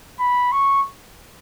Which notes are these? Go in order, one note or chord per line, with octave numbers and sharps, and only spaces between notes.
B5
C#6